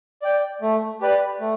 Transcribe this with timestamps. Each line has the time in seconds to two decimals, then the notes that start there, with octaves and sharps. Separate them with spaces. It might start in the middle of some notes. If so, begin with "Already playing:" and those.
0.22 D5 G5
0.62 A3
1.01 G4 B4 D5
1.40 A3